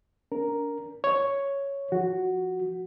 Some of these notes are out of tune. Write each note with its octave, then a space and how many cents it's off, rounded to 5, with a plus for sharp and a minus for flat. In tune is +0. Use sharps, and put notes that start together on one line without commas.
D4 -35 A#4 +0
C#5 +0 C#6 +0
F3 +0 F#4 +0